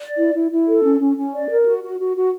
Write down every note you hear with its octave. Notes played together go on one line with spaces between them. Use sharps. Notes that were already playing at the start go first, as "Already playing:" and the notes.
D5
E4
E4
E4
A4
C#4
C#4
C#4
D5
A#4
F#4
F#4
F#4
F#4